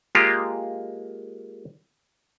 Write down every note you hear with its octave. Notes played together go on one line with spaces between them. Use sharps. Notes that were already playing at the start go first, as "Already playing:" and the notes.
G#3 A#3 F4 G4